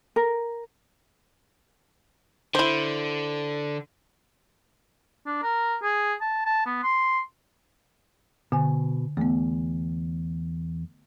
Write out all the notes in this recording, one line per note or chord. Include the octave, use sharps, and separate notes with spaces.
A#4
D3 E4 C5
D4
A#4
G#4
A5
A5
B3
C6
B2 D3 G#5
E2 A3 B3